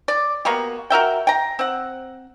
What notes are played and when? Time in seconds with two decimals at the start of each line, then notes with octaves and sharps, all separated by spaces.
0.08 D5
0.45 A#3 B3 F#4 G4
0.90 F#4 A#4 E5 G5
1.27 G5 A#5
1.59 C4 F#5